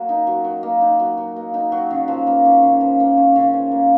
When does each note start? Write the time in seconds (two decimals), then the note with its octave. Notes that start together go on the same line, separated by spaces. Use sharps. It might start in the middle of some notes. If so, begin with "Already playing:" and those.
Already playing: F#3 A#3
0.09 D#4
0.27 F#3
0.45 F#3
0.63 A#3
0.81 D#4
1.00 F#3
1.18 F#3
1.36 A#3
1.54 D#4
1.72 F#3
1.90 C#3
2.08 F3
2.27 A#3
2.45 C#4
2.63 C#3
2.81 F3
3.00 A#3
3.17 C#4
3.36 C#3
3.53 F3
3.72 A#3